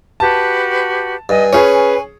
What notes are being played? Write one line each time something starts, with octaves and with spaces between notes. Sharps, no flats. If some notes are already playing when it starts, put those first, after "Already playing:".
F#4 G4 B4 A5
G2 D#5 G#5
C#4 G#4 B4 C#5